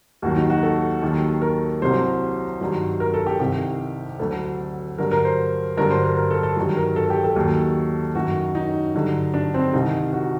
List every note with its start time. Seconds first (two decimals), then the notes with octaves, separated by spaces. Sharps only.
0.22 D#2 D#3 F#3 F#4
0.36 D#4
0.50 F#4
0.63 A4
1.02 D#2 D#3 F#3
1.42 A#4
1.82 C2 C3 F#3 C5
2.61 G2 D#3 F#3
3.00 A#4
3.14 A4
3.26 G4
3.40 C2 C3 D#3 G4
4.19 D2 D3 F#3 A4
4.98 G2 D3 F#3 A#4
5.11 A#4
5.25 C5
5.77 G2 D3 F#3 A#4
5.90 C5
6.04 A#4
6.17 A#4
6.31 A4
6.43 A4
6.56 G2 D#3 F#3
6.77 A#4
6.96 A4
7.10 G4
7.24 A4
7.36 D#2 D#3 F#3
8.15 F#2 D#3 F#3 F#4
8.55 D#4
8.94 G2 D3 F#3
9.34 D4
9.54 C4
9.73 C2 C3 D#3 D#4
10.13 F#4